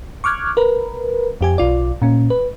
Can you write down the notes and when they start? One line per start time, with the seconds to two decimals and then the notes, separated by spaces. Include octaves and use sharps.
0.24 C#6 D6 F6 F#6 G#6
0.57 A#4 B4
1.41 F2 G4 G#5
1.58 B1 F4 D5
2.02 A#2 C#4
2.30 B4